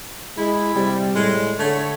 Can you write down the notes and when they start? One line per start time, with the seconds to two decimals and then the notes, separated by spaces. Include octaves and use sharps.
0.37 G#3 E4
0.75 C3 G3
1.15 A2 G#3
1.59 D3 A3 C#5